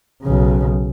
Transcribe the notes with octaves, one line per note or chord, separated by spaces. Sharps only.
B1 C#3